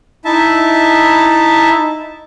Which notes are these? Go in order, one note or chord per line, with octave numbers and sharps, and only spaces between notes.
D#4 E4 E5 A5